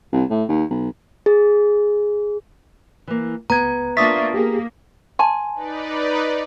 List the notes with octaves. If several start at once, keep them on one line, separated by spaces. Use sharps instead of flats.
C2
A2
D#2
B1
G#4
E3 A#3
C#2 B3 A#5 G#6
A#3 D4 F4 E5 C#6 D#6 A6 B6
A#3 G4 G#4
G#5 A5 C6
D#4 B4 D5